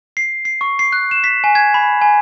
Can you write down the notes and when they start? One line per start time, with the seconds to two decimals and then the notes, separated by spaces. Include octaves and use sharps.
0.17 C7
0.45 C7
0.61 C#6
0.79 C7
0.92 F#6
1.11 E7
1.24 B6
1.44 G#5
1.55 G#6
1.74 B5
2.01 G#5